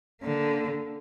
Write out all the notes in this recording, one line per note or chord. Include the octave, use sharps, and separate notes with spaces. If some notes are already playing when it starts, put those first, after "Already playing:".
D3 A#3